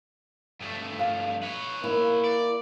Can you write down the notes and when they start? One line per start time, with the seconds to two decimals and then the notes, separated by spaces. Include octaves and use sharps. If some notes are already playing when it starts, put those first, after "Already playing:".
0.60 G2 A3
0.99 F5
1.43 B4 C#5
1.84 A#3 E4
2.24 D5